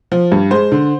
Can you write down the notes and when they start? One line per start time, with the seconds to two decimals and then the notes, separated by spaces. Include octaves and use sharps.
0.12 F3
0.32 G2
0.51 G#3 C5
0.72 D3